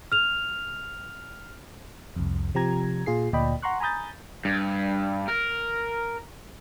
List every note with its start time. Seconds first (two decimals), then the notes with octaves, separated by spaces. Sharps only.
0.12 F6 F7
2.16 C2 F2
2.54 C3 F3 G4 A#5 G#6
3.06 A#2 F4 G#4 C7
3.33 D2 A#2 D5 D#5 G5 B5
3.62 F#5 A#5 C6 C#6 F#6
3.80 G#5 A#5 B5 D#6 G6 A6
4.45 G2
5.28 A#4